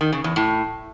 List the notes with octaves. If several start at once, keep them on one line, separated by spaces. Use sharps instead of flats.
D#3
C#3
E2
A2